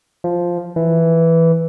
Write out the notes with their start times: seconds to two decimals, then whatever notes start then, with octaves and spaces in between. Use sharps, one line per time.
0.24 F3
0.76 E3